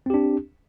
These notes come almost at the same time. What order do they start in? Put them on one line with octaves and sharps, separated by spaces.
C4 G4 D4